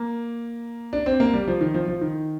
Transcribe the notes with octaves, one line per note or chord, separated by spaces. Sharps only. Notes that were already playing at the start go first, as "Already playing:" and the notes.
Already playing: A#3
D4
C4
A#3
G3
F3
D#3
F3
F3
D#3